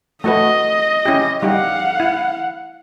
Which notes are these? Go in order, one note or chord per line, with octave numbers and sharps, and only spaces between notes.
A3 F#4 B4 D#5
C#4 E4 G4
G3 D#4 G4 F5 F#5
E4